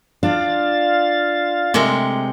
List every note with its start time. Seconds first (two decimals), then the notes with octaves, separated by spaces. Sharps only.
0.23 D4 F4 F5 A6
1.74 C3 G#3 A3 A#4